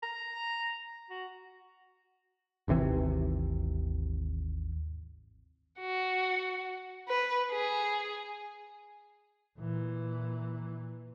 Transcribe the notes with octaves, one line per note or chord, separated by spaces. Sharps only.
A#5
F#4
G#1 D#2 C3 E3
F#4
B4
G#4
A#2 E3